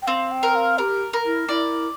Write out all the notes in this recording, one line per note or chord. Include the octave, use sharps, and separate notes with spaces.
G5
C4 F5
G5
A#4
F5
G4 A#4
A#4
E4
E4 D5